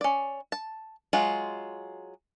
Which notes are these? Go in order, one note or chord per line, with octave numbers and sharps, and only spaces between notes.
C#4 D5
A5
F#3 G#3 F4